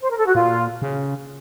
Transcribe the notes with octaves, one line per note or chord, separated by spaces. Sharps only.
C5
A#4
A4
F#4
A#2 F4
C#3